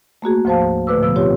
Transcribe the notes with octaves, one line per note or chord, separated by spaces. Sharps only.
A3 A#3 F#4 G#4
D2 G#2 F3 C5 F5 A5
A2 D3 A3 B4 D6 E6
B2 D3 F3 B3 E6
C4 F4 G4 C#5